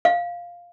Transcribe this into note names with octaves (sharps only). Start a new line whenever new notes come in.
F5